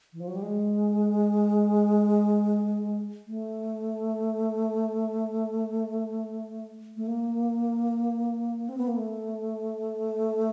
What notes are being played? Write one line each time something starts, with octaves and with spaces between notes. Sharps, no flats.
E3
F3
F#3
G3
G#3
A3
A3
A#3
C4
B3
A#3
A3